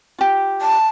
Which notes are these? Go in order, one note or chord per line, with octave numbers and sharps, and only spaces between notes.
F4 G4
A5